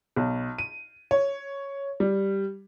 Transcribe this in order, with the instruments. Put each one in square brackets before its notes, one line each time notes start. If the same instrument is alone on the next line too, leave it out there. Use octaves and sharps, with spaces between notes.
[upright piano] B1
D#7
C#5
G3